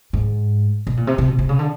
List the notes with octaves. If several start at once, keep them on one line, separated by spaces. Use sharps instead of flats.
G#2
B2
A#2
C3
C3
B2
C3
C#3
D3